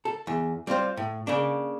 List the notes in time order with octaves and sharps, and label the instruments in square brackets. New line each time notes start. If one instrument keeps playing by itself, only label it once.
[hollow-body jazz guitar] A4
E2
G3 C4 F4 C5
A2
C#3 A#3 D4